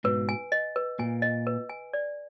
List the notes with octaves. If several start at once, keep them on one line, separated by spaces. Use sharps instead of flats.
G#2 B2 B4
G#5
D#5
B4
A#2 G#5
D#5
B4
G#5
D5